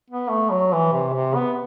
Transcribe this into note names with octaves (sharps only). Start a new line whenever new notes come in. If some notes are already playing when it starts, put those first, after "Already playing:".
B3
A3
F#3
E3
C3
C3
B3